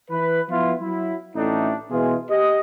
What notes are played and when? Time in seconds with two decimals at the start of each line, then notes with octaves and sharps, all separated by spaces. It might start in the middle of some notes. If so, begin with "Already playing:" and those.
0.10 E3 B4
0.50 F3 B3 E4 F4
0.81 F#3 E4
1.36 A1 A2 A3 D4 D#4
1.91 B2 E3 G#3 F4 G#4
2.30 G4 D#5